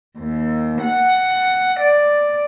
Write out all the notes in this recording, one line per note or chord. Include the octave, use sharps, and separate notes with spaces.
D#2
F#5
D5